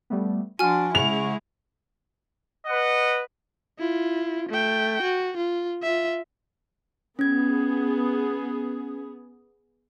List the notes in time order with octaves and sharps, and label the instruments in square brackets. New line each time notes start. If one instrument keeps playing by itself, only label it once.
[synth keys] G3 A3 B3
[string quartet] F3 D4 [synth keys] F#4 F#5 C6 [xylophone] G#5 F6
[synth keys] C#3 F#5 C#6 [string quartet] G#3 E4 [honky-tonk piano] F7
[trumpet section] B4 D#5 F#5
[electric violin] E4 F4
A3 G5
F#4
F4
F4 E5
[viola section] B3 G#4 [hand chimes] C#4 G#6